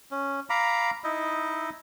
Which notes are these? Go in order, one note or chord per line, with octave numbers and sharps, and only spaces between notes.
C#4
F5 A#5 B5 D6
D#4 E4 D#5 E5